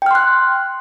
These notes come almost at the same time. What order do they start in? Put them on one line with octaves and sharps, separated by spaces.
G5 F6 C6 F#6